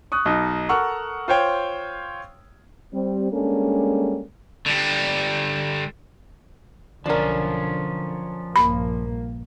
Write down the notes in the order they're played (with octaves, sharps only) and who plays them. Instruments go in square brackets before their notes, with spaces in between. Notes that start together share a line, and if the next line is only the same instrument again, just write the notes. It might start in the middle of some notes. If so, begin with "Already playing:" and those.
[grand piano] C#6 D#6 F#6
B1 D#4
A4 A#4 F#5 C#6 E6 F6
F4 C5 C#5 G5
[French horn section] G3 C4
G3 G#3 A#3 C#4 D4 A4
[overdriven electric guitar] D3 G3
[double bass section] B1 D3 [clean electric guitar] F3 C#4 [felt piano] D4 A#4
[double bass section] A#1 G2 A#3 [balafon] B5